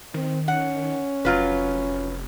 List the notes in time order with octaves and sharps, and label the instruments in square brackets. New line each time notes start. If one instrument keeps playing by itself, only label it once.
[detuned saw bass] D#3 [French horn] C4
[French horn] C#4 [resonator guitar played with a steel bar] F#5
[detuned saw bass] F1 [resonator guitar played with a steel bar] F#3 F4 B4